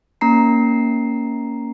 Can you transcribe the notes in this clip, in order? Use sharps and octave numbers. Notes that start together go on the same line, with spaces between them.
A#3 C#4 A#5 C7